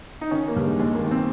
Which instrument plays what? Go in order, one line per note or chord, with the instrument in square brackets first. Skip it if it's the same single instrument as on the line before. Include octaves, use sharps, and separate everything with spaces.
[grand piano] D#4
D#3 C#4
A#3
G2
G#3
D#2 G#3
A#3
D#3
C4